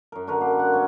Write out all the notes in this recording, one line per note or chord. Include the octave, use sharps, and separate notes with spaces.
F#2 A#4
D3 F#4 A#4 B4
A#3 C6
F#5
B3 C#4